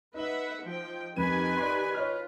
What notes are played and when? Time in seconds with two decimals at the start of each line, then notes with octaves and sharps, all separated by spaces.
0.14 D#4 B4 E5 F#5 F#7
0.63 F3 G5
1.16 F2 D#3 G4 B4 G#5 D#7
1.57 D5 C6
1.94 F4 C#5 D#5 F6